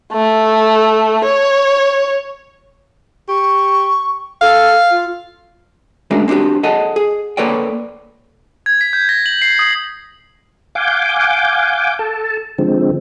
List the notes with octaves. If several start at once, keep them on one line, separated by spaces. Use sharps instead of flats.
A3
C#5
G4 C#6
A4 F5
F4
G#3 A3 C#4 D4 F#4 A#4
C4 D4 D#4 F#4 G4
G#4 A4 D#5 F#5 A5
G#4
A#3 A4 B4 C#5 D5 G5
G#6
B6
G6
A#6
F#7
C7
D#6
F5 F#5 G#5 D6 G6
A4 A5
D3 F3 G#3 C4